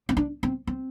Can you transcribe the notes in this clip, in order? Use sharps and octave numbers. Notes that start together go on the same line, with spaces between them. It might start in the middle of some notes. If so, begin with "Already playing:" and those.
C4
D4
C4
C4